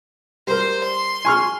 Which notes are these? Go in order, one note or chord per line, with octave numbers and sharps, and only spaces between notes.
G3 A#4 C5
C6
G#5 C#6 F6